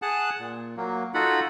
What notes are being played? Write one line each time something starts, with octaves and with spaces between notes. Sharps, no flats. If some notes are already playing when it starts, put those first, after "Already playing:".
G#4 F#5 A5 F#6
A#2
F#3 A#3
D#4 F4 F#4 A4 F#5 B5